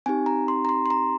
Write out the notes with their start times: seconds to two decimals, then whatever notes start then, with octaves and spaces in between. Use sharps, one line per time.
0.06 C4 D#4 G4 G#5
0.26 A#5
0.48 C6
0.65 A#5
0.69 C6
0.86 C6
0.90 A#5